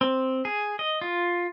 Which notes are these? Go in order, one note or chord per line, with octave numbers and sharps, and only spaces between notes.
C4
G#4
D#5
F4